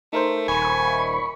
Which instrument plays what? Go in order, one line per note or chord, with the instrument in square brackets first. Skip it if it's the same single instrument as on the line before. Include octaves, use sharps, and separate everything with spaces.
[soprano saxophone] A3 [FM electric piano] D#4 A#4 C5
[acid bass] D#1 [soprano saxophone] G#5 [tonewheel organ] B5 C#6